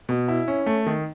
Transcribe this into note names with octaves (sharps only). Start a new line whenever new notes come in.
B2
E4
C#4
A3
D#3